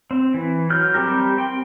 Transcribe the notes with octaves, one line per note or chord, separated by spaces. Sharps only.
C4
E3
F#3 F6 G6
G3 A3 C4 G4 A#4
C4 G5 C6